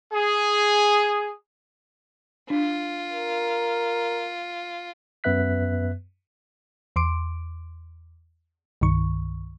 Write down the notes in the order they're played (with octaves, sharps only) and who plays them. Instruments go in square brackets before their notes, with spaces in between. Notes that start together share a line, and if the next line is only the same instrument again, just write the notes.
[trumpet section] G#4
[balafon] D4 [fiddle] F4
[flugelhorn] A#4
[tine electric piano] F#2 B3 B4 E5 F#6 B6
[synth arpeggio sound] E2 C6 D6 D7
C2 G2 D#3 C#6